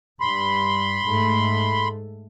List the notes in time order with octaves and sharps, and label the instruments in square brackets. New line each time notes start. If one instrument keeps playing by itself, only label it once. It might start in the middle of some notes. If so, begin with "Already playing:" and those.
[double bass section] G2 [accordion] B5 C6
[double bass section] G#2 A3